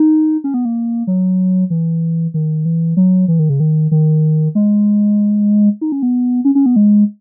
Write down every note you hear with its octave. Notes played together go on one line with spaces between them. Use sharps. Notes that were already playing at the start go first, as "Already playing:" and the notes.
Already playing: D#4
C#4
B3
A#3
F#3
E3
D#3
E3
F#3
E3
D#3
C#3
D#3
D#3
G#3
D#4
C#4
B3
C#4
C#4
B3
G#3